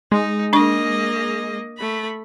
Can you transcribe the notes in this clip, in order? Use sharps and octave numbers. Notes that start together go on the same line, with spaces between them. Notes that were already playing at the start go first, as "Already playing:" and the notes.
G#3 D#4
A#3 D4 D#5 C#6
A3 B5